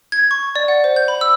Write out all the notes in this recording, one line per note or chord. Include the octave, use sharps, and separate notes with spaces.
G#6
C#6
D5
F#5
C5
G6
B5
E6